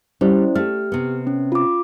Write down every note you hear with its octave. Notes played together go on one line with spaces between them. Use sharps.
G3 C#4 E4 C5
A3 G4 F6
C3 B3
C#4
F4 D6